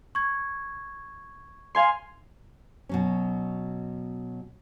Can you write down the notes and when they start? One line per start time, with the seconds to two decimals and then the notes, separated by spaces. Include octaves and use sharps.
0.15 C#6 G#6
1.75 F5 G#5 C6
2.89 B2 F#3 C#4